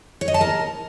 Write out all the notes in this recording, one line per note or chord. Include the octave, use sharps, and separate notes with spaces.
C#5
D#5
A5
A#4